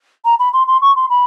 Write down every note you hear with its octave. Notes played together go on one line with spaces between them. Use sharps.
A#5
B5
C6
C6
C#6
C6
B5